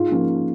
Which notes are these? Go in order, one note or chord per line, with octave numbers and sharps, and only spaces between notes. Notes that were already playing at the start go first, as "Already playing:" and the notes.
Already playing: G#2 F4
F3 A#3 C#4